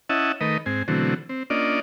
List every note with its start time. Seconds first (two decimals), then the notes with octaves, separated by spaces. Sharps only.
0.09 C#4 E4 D#5 E5 F#5 A5
0.41 D#3 A3 A#4 B4 D#5
0.66 G#2 C4 G#5
0.88 B2 D3 E3 F#3 A3 C4
1.29 C4
1.50 A#3 C#4 D4 F4 D5 D#5